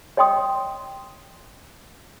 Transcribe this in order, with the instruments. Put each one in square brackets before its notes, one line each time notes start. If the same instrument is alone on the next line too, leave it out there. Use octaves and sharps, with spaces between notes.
[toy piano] C#5 D#5 G5 C6 D#6